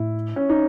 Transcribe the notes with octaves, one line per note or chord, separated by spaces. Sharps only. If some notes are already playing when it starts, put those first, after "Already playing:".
Already playing: A2 E4
C#4
D#4